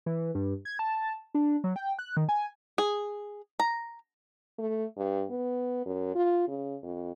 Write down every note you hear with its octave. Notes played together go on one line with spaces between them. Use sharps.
E3
G2
G#6
A5
D4
F#3
G5
F#6
D#3
G#5
G#4
A#5
A3
G2
B3
F#2
F4
C#3
F2